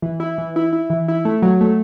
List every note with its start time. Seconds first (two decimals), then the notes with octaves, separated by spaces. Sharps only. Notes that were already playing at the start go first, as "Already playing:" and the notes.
0.02 E3
0.20 E4
0.38 E3
0.56 E4
0.73 E4
0.90 E3
1.08 E4
1.25 A3
1.42 F#3
1.61 A3